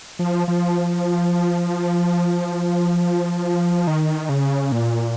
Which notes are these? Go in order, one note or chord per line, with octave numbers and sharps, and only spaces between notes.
F3
F3
D#3
C#3
A#2